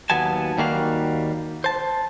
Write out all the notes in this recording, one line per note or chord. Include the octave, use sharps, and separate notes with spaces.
D#2 F#3 B3 G#5 A5
D#2 D#3 G3 A#3 F#4 F5
C5 A5